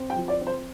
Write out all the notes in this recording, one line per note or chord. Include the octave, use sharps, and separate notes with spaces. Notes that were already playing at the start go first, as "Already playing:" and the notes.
Already playing: C4
G5
F3
D5
C4
C5